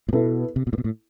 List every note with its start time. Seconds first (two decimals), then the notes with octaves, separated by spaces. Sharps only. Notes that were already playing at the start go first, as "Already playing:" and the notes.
0.09 A2
0.13 B2 B3 E4 A4
0.56 C3
0.67 B2
0.73 A2
0.78 B2
0.84 A2